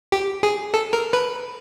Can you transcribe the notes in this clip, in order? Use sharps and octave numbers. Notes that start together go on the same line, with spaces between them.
G4
G#4
A4
A#4
B4